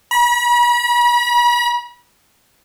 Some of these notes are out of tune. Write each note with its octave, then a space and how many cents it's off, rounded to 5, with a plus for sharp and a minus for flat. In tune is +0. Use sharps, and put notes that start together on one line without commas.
B5 -40